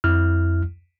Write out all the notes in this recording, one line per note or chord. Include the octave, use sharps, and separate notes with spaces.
F2 E4 F6